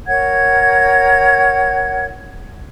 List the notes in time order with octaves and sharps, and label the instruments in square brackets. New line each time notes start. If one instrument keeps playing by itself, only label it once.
[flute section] A#4 C#5 F#5 G#6